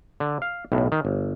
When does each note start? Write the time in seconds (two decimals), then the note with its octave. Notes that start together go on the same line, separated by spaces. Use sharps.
0.20 D3
0.42 F5
0.72 B1 A2
0.92 D#3
1.05 G1